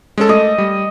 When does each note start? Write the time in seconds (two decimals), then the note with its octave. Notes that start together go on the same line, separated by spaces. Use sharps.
0.18 G#3 C#4 A4
0.29 A3 D#5
0.58 G3